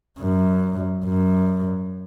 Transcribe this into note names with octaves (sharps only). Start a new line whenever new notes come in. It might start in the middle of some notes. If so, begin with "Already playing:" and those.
F#2
F#2